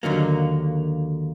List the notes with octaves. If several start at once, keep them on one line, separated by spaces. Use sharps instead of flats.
D#2 D3 F#3 A#3